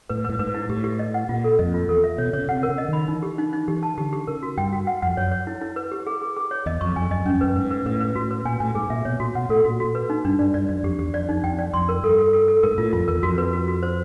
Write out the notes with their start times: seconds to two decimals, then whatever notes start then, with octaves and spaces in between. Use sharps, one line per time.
0.09 A2 B4
0.24 A2 B4
0.39 G#2 B4
0.54 E4
0.69 A2 G4
0.84 G4
0.99 D#5
1.14 F#5
1.29 A#2 F4
1.44 A4
1.59 F2 D#5
1.74 F4
1.88 E2 A4
2.04 E5
2.18 B2 C#5
2.33 C#3 C#5
2.48 C3 F#5
2.63 A#4
2.69 C#3
2.78 D#5
2.88 D#3 B5
3.08 E3 D#4
3.23 G4
3.38 D#4
3.53 D#4
3.68 E3 G4
3.83 A5
3.98 D3 G4
4.13 G4
4.27 C#3 A#4
4.43 F#4
4.57 G2 G5
4.72 F#4
4.87 F#5
5.02 F2 F#5
5.17 F#2 C#5
5.31 C#5
5.47 E4
5.61 E4
5.76 B4
5.92 G4
6.07 G#4
6.22 G#4
6.36 G#4
6.51 C#5
6.66 E2 D#5
6.81 F2 C#6
6.96 F2 G#5
7.11 F#2 D#5
7.26 F#2 C#4
7.35 F2
7.41 F#2 B4
7.56 G#2 B4
7.71 B4
7.86 A2 B4
8.00 B4
8.15 A2 F#4
8.31 B4
8.45 A#2 G#5
8.60 A2 G#5
8.75 G#2 G#4
8.90 A#2 E5
9.05 B2 C#5
9.20 A#2 F#4
9.35 B2 F#5
9.49 A2 A4
9.65 A#2 F#4
9.80 A#2 F#4
9.95 B4
10.10 D#4
10.25 G2 D4
10.39 G2 D5
10.54 G2 D5
10.69 F#2 D5
10.84 F2 G4
10.99 E2 G4
11.14 F2 D5
11.29 F2 D#4
11.44 F2 G5
11.59 D5
11.74 F2 C6
11.89 A#4
12.04 G2 A4
12.18 A4
12.33 A4
12.48 A4
12.63 G#2 A#4
12.78 A2 F4
12.93 F2 F4
13.08 E2 A#4
13.23 F2 F#4
13.38 B4
13.53 F#4
13.68 F#4
13.83 C5